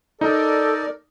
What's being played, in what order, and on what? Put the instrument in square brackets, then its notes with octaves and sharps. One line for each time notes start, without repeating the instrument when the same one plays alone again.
[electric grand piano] D#4 [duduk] A4 [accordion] A#4 D5